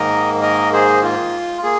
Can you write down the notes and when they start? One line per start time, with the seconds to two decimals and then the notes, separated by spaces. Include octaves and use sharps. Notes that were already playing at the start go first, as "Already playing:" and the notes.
Already playing: G#2 D#3 A#3 A#4 D#5
0.41 A#4 D#5
0.73 G#4 C5
1.03 F4
1.63 A#3 G#4